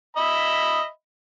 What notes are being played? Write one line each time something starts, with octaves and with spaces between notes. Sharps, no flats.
D#5 E5 B5